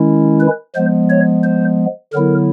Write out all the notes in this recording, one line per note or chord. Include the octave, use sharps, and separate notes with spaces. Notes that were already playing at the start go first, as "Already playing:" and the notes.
Already playing: D#3 G#3 C#4 E4
B4
F3 G#3 B3 C5
C#5
C5
D3 F#3 B3 E4 A#4